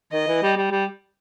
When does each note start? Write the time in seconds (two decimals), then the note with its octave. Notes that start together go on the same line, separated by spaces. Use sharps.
0.13 D#3 D#5
0.27 E3
0.42 G3
0.57 G3
0.71 G3